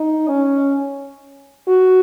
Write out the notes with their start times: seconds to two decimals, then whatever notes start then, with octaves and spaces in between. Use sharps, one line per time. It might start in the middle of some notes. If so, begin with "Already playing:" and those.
Already playing: D#4
0.28 C#4
1.68 F#4